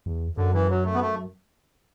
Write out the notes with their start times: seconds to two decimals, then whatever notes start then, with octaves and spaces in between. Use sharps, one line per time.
0.06 E2
0.37 F#2 D3
0.53 E3
0.70 F#3
0.85 A3
0.94 B3
1.01 A3